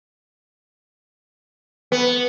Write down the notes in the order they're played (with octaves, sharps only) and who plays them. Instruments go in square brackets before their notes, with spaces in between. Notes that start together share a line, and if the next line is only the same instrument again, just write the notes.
[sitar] B3